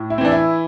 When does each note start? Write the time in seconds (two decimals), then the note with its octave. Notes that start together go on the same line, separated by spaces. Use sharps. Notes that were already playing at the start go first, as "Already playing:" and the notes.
Already playing: A2
0.10 E4
0.18 C4
0.21 E3 D4
0.32 E4